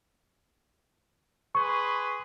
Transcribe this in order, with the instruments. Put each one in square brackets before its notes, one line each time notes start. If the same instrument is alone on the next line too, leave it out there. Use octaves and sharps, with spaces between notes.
[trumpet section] G#4 B4 C6 [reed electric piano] C#6